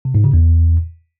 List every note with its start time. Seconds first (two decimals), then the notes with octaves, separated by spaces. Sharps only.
0.05 C3
0.15 G#2
0.24 C#3
0.34 E2